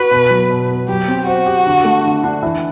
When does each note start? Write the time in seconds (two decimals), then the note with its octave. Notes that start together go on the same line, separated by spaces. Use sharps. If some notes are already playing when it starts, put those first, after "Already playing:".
Already playing: F#4 B4
0.11 B2
0.30 F#3
0.50 B2
0.70 B3
0.88 F#3 G4
1.08 C4
1.27 F#4 C5
1.46 G4
1.66 D3
1.84 A3
2.04 D3
2.24 D4
2.43 E3